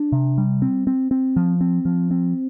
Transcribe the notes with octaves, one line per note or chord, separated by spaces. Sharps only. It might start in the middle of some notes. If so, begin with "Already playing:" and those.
Already playing: D4
C3
G3
C4
C4
C4
F3
C4
F3
C4